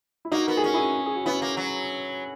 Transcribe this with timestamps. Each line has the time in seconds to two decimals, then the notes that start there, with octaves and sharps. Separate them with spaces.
0.25 E4
0.32 A#3 D#4 F#4
0.47 B3 A#4
0.57 G#4
0.64 C#4 F#4
0.74 E4 G#4
1.06 G#4
1.15 F#4
1.26 B3 C#4 E4
1.42 A#3
1.57 F#3